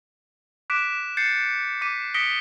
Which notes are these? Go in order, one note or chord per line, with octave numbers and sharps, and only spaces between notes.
D6 F#6 B6 D7 E7
G6 A6 C7 C#7
D6 B6 D#7
D#6 A#6 B6 C#7 D7 G7